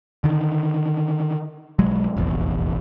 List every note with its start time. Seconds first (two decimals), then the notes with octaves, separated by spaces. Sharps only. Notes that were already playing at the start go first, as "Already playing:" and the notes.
0.24 D3 D#3
1.79 B1 F#3 G#3
2.17 F1 A#1 E2